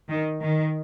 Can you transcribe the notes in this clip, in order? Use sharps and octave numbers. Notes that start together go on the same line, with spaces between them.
D#3
D#3